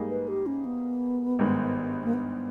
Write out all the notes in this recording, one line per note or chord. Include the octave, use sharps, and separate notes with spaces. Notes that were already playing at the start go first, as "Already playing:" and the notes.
Already playing: G#2 G3 A#3 D#4 G#4
B4
G4
C#4
B3
G#1 G2 D#3 G#3
A#3
B3